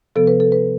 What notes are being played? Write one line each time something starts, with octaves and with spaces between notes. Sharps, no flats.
C3 F3 B3 A4
B4
A4
B4